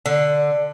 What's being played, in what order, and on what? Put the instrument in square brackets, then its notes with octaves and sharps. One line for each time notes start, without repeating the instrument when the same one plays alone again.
[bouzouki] D3